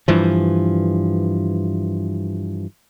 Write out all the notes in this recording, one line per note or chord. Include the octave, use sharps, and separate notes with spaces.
G2 E3 F3